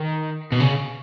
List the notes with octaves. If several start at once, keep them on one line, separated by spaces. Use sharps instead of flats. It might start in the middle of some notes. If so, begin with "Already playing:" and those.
Already playing: D#3
B2
C#3